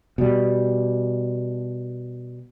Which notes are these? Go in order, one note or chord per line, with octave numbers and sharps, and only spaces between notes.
B2 G3